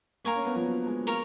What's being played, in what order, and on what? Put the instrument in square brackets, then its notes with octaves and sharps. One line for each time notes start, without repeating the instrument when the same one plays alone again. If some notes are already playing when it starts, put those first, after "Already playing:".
[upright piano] A#3 [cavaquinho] A#4 F5 G#5 C#6
[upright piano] C#4
B3
F3
F#3
G#3
[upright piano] A#3 [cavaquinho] A#4 C#5 F5